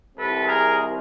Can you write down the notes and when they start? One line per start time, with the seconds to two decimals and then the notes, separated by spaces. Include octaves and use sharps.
0.16 C2 C3 D#3 A4 B4
0.47 G#4 A#4